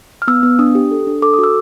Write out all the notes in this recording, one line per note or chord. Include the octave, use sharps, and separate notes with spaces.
F6
B3 E6
B3
D4 D#6
G4
A4
D4
A4 D6
D#6
F#4 E6